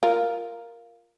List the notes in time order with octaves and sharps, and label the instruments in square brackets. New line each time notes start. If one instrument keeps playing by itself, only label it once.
[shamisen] F4 A#4